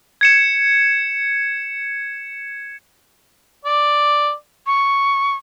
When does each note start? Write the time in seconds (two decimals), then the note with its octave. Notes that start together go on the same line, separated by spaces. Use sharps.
0.21 G#6 C#7 E7
3.65 D5
4.67 C#6